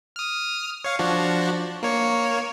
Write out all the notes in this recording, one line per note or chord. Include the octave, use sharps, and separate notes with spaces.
D#6 F6
C#5 F5
F3 D4 F#4
A#3 C#5